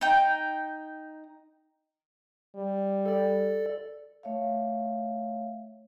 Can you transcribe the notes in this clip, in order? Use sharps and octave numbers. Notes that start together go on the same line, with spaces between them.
D#4 G5
G3
A4 D5
A3 C#5 E5 F5